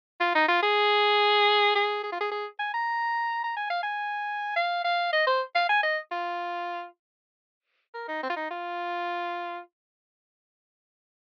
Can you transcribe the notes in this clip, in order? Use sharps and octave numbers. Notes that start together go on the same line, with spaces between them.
F4
D#4
F4
G#4
G#4
G#4
F4
G#4
G#4
G#5
A#5
A#5
G#5
F5
G#5
F5
F5
D#5
C5
F5
G#5
D#5
F4
A#4
D#4
C4
F4
D#4
F4